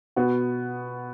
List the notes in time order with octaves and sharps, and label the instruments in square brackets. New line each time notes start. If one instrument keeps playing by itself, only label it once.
[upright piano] B2 B3 F#4